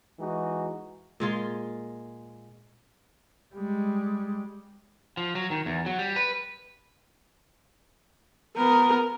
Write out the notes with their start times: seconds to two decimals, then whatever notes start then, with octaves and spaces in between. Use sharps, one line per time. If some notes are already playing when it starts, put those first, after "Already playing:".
0.20 E3 G#3 D#4 F#4
1.20 A#2 G#3 F4
3.55 G3 G#3
5.17 F3
5.35 F#3
5.51 D#3
5.66 E2
5.86 F#3
5.99 G3
6.16 B4
8.57 B3 A#4